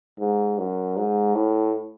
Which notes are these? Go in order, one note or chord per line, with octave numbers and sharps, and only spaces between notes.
G#2
F#2
G#2
A2